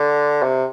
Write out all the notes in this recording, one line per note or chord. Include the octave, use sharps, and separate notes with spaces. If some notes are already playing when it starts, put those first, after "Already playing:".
Already playing: D3
C3